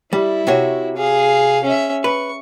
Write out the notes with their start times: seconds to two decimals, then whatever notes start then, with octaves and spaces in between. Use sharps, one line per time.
0.13 G3 E4
0.47 C3 F#4 C#5
0.96 G#4 F5
1.64 C#4 E5
2.04 B4 C#6